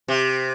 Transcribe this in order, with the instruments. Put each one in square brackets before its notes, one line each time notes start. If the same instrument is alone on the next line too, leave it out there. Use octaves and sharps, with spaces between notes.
[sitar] C3